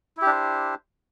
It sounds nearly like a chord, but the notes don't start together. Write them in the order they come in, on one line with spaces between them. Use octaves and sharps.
E4 G4 D4 C5